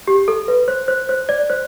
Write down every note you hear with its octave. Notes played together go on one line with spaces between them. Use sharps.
G4
A4
B4
C5
C5
C5
D5
C5